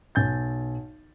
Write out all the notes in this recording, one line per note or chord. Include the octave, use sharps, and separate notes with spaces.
B1 G#5 G6 A6